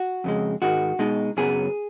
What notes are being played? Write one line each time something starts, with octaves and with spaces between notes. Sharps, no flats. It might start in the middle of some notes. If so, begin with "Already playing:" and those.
Already playing: F#4
F2 C#3 G#3
G#2 D#3 G#3 F#4
B2 G#3 D#4
F#2 C#3 F#3 B3 G#4